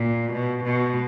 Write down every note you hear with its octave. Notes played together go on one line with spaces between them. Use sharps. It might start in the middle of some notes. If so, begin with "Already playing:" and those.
Already playing: A#2
B2
B2